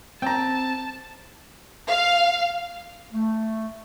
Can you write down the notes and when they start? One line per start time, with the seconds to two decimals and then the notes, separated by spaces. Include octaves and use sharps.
0.22 C4 G5 A5 A#5
1.88 F5
3.13 A3